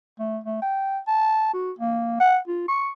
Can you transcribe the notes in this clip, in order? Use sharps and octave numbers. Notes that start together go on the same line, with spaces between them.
A3
A3
G5
A5
F#4
A#3
F#5
F4
C#6